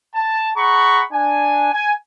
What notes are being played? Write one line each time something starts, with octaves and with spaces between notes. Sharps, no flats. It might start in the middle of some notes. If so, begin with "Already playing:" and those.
A5
G#4 F#5 A#5 B5 C#6
D4 G#5
G#5